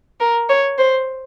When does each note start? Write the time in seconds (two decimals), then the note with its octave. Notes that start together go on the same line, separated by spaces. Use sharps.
0.20 A#4
0.49 C#5
0.78 C5